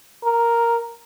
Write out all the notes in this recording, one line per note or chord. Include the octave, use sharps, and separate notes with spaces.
A#4